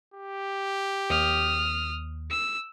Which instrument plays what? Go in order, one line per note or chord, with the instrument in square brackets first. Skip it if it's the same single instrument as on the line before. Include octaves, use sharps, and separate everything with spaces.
[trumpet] G4
[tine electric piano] D#2 [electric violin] D#6 F6
[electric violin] E6